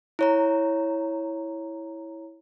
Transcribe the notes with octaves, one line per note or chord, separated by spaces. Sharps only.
E4 C#5 A#5